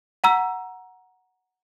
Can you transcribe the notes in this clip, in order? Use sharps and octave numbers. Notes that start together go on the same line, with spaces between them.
F#5 A#5 E6